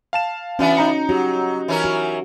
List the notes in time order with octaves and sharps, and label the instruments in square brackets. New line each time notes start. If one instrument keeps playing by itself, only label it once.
[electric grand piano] F5 A5 E7
[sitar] E3 B3 D4 [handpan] C#4 F#4
[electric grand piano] D#4 A#5 C#7
[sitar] F#3 [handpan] F#4 G4
[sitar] E3 C#4 A#4
[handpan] F#4